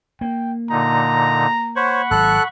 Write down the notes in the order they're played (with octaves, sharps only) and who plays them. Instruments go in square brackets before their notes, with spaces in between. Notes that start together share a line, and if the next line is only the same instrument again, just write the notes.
[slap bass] A#3 [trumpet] G5
[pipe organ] A#2 D3 D#4 [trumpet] A#5
[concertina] C5 C#5 [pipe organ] F#5 B5 C#6
[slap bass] G#1 F#3 [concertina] A4 F#6